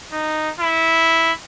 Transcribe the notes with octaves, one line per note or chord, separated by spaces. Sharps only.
D#4
E4